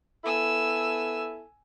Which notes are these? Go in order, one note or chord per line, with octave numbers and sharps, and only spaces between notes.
B3 E4 A4 G#5 E6